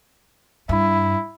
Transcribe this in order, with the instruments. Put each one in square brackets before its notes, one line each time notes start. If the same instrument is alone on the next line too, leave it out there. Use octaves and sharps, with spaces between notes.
[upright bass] G2 [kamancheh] E4